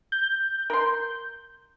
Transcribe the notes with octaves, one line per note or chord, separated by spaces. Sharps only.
G6
A#4 C6